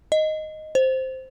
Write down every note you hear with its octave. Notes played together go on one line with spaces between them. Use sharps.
D#5
C5